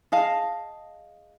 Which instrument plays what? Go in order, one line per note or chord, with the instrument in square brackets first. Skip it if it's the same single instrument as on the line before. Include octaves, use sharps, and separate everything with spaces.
[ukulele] G#4 D#5 F5 A5